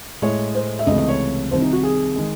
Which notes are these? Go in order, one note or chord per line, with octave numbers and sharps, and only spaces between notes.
A2 G#3 C#5
C5
E5
C#2 C3 E3 A3 D#5
D#5
C#5
C2 C3 D#3 C5
D#4
F#4
G#4
D#3 G#3